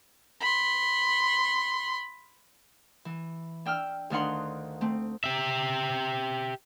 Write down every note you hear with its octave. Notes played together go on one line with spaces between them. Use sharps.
B5 C6
E3
D4 G5 E6 F6
D2 D#3 D4 F5 F#5 C6
A3 C4
G4 E5